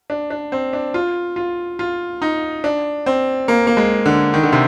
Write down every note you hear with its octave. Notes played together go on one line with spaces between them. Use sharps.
D4
D4
C4
D4
F4
F4
F4
D#4
D4
C4
A#3
A#3
G#3
D3
D#3
D3
C3